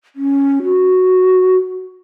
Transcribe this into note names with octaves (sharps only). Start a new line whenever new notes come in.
C#4
F#4